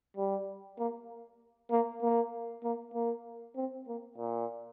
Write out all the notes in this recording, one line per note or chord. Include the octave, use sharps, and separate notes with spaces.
G3
A#3
A#3
A#3
A#3
A#3
C4
A#3
A#2